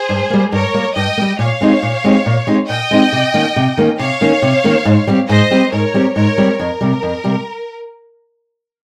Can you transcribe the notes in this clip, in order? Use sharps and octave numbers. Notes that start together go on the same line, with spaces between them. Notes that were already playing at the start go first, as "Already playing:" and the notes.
Already playing: G#4 C5
G2
G3 A#3
G2 A#4 C#5
G3 A#3
G2 D#5 G5
A#3
G3
A#2 C#5 F5
G#3 C4 D#4 G4
A#2
G#3 C4 D#4 G4
A#2
G#3 C4 D#4 G4
A#2 D#5 G5
G#3 C4 D#4 G4
C3
D#3 A#3 C#4
C3
D#3 A#3 C#4
C3 C#5 F5
D#3 A#3 C#4
C3
D#3 A#3 C#4
G#2
G3 C4 G4
G#2 C5 D#5
G3 C4 G4
G#2 A#4 C#5
G3 C4 G4
G#2 A#4 C#5
G3 C4 G4
F2 A#4
C3 G3
F2
C3 G3